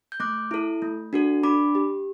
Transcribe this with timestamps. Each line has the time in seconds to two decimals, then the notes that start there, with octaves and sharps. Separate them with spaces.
0.12 G6
0.20 A3 D6 F#6
0.51 E4 A4
0.82 A3
1.13 D4 F#4 A4
1.43 D4 B5 D6
1.75 G4